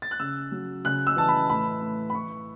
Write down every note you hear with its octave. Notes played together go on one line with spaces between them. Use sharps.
A6
F#6
C#3 E6
F#3
C#3 F#6
E6
E3 A5
B5
A2 B5
A3
B5
E3 C#6